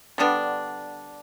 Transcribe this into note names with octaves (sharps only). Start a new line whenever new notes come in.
D3 G3 B3 D4